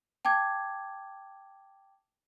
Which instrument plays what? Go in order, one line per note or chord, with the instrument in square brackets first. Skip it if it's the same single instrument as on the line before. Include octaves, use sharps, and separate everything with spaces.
[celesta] G5 A5 D6 G#6